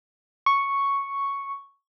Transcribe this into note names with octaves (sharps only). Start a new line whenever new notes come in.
C#6